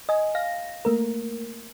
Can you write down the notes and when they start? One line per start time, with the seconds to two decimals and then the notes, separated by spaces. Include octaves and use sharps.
0.09 D#5 G#5
0.35 F5 A#6
0.85 A3 A#3 A#4